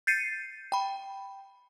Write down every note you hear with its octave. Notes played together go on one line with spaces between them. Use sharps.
G6 A6 C7 C#7 D#7
G5 B5